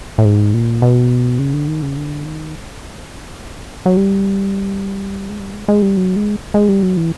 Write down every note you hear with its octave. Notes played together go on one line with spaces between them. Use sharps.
A2
G#2
A#2
B2
C#3
D3
D#3
C#3
D3
D#3
F#3
G3
G#3
G3
G#3
G#3
G3
F#3
G#3
G#3
G3
F#3
E3